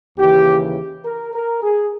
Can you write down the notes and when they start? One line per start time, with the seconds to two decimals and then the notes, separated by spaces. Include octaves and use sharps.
0.17 D#2 C#3 E3 G4
1.05 A#4
1.34 A#4
1.62 G#4